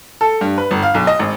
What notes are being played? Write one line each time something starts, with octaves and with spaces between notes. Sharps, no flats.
A4
G2
B4
G1
F5
B1
D#5
G#1